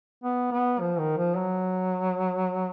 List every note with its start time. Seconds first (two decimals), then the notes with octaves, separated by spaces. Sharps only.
0.24 B3
0.52 B3
0.80 F3
0.99 D#3
1.17 F3
1.37 F#3